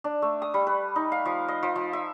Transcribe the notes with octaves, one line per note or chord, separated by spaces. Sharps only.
D4
A3
D#6
G3
B4
D#4
F5
F3
D#5
F3
F3
E5